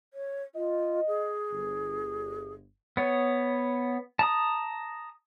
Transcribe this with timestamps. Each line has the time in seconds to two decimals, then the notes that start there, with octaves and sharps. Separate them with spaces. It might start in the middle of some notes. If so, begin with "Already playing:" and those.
0.14 C#5
0.55 F4 D#5
1.08 G#4
1.52 G1
2.97 B3 C#5
4.19 A5 A#5 D#6